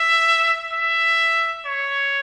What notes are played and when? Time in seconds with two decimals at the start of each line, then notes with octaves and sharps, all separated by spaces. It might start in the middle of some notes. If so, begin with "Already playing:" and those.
Already playing: E5
0.72 E5
1.66 C#5